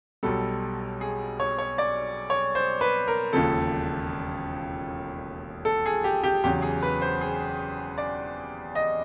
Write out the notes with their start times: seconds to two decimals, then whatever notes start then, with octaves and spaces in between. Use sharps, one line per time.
0.23 B1 B2 G3 A4
1.01 G#4
1.40 C#5
1.58 C#5
1.78 D5
2.30 C#5
2.55 C5
2.81 B4
3.08 A#4
3.33 E1 D#2 C#3 F3 A4
5.65 A4
5.86 G#4
6.04 G4
6.23 G4
6.44 E2 C#3 F#3 G4
6.62 G#4
6.83 B4
7.01 C5
7.21 G#4
7.98 D5
8.75 D#5